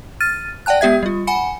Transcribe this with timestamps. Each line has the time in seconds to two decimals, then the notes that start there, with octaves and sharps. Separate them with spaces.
0.21 F6 A6 D#7
0.66 D5 F#5 G5 A5 F#6
0.81 G#3 B3 G4 E5 G#6
1.03 G3 F4
1.27 F#5 G#5 B5 C#7